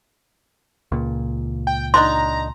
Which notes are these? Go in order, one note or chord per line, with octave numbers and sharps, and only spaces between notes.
C#2 A#2
G5
D3 D4 D#4 A#5 C6